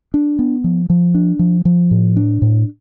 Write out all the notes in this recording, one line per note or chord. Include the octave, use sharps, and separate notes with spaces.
D4
B3
F3
F3
D4
F3
F3
A2
D4
A2